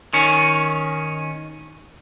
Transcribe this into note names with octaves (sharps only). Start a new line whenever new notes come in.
D#3 C#4